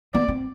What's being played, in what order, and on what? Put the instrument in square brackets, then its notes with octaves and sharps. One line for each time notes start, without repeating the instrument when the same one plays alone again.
[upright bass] B3 [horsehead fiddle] D5
[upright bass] C4